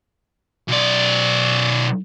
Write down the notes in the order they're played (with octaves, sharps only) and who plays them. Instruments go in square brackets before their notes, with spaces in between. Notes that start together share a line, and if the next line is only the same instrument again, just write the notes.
[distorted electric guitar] B1 D5